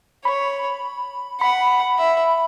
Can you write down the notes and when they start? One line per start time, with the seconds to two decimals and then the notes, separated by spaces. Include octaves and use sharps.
0.25 C#5 B5
1.41 F#5 B5
1.99 E5